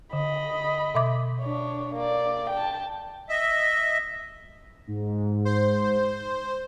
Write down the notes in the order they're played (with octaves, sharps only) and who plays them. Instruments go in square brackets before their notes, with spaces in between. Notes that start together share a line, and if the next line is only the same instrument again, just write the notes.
[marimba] D3 [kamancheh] D#5 B5
[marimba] B2 E5 D6
[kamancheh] D4 C#5
A#3 D5
G5 A5
[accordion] D#5 E5
[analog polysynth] G#2
[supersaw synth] C5